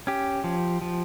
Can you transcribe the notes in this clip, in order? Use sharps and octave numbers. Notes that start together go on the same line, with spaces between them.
C#4 G4
F3
F3